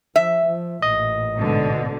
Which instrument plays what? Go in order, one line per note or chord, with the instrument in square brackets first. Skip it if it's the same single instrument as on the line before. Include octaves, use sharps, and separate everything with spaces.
[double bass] F3 [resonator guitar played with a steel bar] E5
[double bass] F3
[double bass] A1 A#2 [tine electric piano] D#5
[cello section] G#2 B2 D3